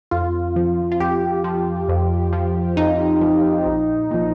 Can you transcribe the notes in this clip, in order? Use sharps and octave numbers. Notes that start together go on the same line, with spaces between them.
F2 F4
F3
F4
F2 G4
F3
F2
F3
F2 D#4
F3
A#1
A#2 F3